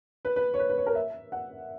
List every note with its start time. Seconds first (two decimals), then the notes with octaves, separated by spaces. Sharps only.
0.25 B4
0.36 B4
0.54 C#5
0.59 B4
0.69 B4
0.78 C#5
0.86 A#4
0.95 E5
1.32 F#5